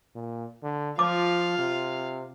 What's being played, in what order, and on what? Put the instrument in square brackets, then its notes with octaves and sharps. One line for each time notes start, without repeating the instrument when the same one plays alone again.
[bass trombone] A#2
D3
[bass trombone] F3 [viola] F4 F5 [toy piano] D6
[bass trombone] C3